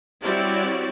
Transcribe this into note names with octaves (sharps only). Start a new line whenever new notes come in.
G3 C4 E4 F#4 C#5 D5